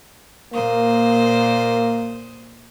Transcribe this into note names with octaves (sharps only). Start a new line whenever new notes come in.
A#2 A#3 C5 D#6